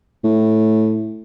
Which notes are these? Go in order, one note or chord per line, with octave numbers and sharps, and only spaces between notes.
A2